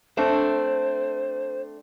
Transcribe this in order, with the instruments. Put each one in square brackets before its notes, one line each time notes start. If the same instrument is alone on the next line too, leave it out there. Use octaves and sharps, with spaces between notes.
[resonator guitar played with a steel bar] A3 C4 D4 [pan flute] C5